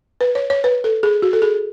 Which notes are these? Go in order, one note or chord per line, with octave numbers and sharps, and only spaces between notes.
B4
C#5
C#5
B4
A4
G#4
F#4
A4
G#4